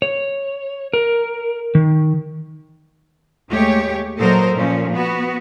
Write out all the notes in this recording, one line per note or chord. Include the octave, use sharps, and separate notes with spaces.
C#5
A#4
D#3
D#2 G#3 A3 G4 C#5
A#2 F#3 A4 A#4 C5 D#5
A#2 F3 C#4
B3 F#4